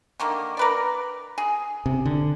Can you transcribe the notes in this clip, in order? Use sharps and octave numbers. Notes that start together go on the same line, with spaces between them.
D3 D#3 A#3
A#4 B4 D5
G#4
C3
D3